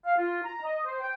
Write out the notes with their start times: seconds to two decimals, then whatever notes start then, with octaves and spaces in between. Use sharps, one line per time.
0.05 F5
0.18 F4
0.44 A#5
0.64 D#5
0.85 C5
1.00 G5